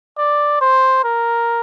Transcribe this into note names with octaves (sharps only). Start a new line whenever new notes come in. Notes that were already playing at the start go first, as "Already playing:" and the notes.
D5
C5
A#4